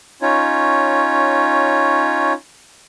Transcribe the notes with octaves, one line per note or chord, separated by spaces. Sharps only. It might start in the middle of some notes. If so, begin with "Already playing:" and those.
C#4 D#4 F4 C#5